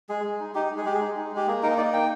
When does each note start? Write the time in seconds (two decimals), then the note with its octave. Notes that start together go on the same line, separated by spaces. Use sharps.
0.09 G#3 G#4
0.24 G#3
0.40 D#4
0.54 D#4 G4
0.71 G#3
0.77 G#4
0.85 G#3 G4
0.95 G#4
1.01 D#4
1.17 D#4
1.32 G#3 G4
1.47 A#3 G#4
1.63 D#4 A#4
1.78 D#4 D5
1.93 A#3 G5